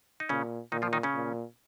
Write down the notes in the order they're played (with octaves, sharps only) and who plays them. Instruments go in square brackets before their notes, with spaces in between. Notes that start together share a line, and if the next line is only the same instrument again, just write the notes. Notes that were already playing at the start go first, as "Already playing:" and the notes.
[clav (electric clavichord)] D#4
[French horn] A#2 [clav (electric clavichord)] C#3 C#4
[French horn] A#2 [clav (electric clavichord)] D#3 D#4
[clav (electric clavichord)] F3 F4
D#3 D#4
C#3 C#4
[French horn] A#2